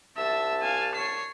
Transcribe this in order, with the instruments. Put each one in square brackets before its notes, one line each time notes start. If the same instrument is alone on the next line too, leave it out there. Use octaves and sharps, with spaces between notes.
[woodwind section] C2 A5 [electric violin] E5
[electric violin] F5 G#5
C#5 C7